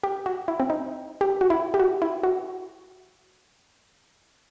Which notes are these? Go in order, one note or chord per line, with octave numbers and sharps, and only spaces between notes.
G4
F#4
E4
C4
D#4
G4
F#4
E4
G4
F#4
E4
F#4